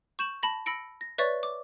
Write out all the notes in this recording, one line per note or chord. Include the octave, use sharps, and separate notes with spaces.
C#6 G6 E7 F#7
A5 B5 A#6
B5 E6 A#6 C#7 D7
A#6
B4 C#5 D5 E5 C#6 A6
D6